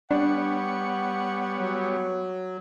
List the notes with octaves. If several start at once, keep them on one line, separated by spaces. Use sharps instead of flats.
G3 B3 D4 C#5 F#5
F#3